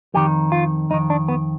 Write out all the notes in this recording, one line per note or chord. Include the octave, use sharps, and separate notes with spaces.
F2 D#3 G4
F4
F2 D#3 D#4
D4
B3